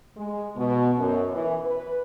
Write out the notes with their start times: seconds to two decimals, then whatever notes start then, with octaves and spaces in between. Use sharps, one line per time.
0.17 G#3
0.56 B2
0.98 F#2
1.32 E3
1.66 B4